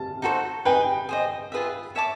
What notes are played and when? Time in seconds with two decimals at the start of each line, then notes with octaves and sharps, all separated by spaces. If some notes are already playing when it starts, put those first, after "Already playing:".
Already playing: A5
0.22 D#4 F#4 A4 C5
0.65 D#4 G#4 B4 G5
1.09 G#4 C5 D#5
1.52 F4 G#4 B4 E5
1.95 C#5 E5 A5 D6